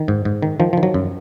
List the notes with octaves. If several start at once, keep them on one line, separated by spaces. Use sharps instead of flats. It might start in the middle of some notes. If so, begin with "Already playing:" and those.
Already playing: D#3
G#2
G#2
D#3
D#3 F3
D#3 F3
F#3
F#2